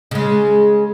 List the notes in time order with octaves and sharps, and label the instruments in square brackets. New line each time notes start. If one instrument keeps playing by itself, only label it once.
[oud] C#3 G#3